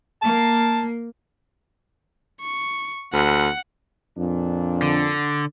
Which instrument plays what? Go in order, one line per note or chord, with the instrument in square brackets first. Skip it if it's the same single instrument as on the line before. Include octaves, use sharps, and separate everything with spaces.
[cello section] A#3 [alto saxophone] A5
[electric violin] C#6
[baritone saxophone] D2 [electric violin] F#5
[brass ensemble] F2 A#2 D4
[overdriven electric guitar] D3